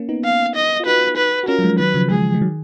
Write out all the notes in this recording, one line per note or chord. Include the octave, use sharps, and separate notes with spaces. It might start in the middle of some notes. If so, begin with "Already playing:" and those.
Already playing: A#3 C#4
B3 D#4
F5
D#5
F4
D#4 F#4 B4
B4
F#4
C#4 F4 A#4
F#3
F3 G#3
D#3 F#3 B4
C#3 F3
F3 G#3 G#4
G#3
D#3 F#3